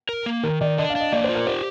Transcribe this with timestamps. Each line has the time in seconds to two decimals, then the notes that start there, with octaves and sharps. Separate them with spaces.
0.09 A#4
0.26 A#3
0.43 D#3 A#4
0.61 D#3 D5
0.78 D4 D#5
0.90 F5
0.95 D4 D#5
1.13 A#3 D5
1.24 C5
1.29 F4
1.35 A#4
1.47 G4 C5